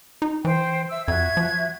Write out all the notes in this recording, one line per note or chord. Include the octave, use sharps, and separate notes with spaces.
D#4
E3 C5 G5
E5 E6
F2 F#4 E5 G#6
F3